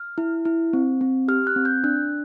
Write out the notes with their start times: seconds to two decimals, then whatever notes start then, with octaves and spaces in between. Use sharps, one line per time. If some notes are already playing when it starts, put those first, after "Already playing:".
Already playing: F6
0.18 E4
0.45 E4
0.73 C4
1.01 C4
1.28 G4 F6
1.47 F#6
1.56 C4
1.65 G6
1.84 D4 F#6